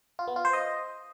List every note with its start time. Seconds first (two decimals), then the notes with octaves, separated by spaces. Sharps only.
0.19 F4
0.28 B3
0.36 F4
0.45 C5
0.53 D#5